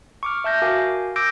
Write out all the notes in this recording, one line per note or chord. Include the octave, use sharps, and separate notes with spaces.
C#6 D6 F6
E5 A5 G6 A#6
F#4 A#4 F5 G#5 D6
D6 E6 G6 A#6 D7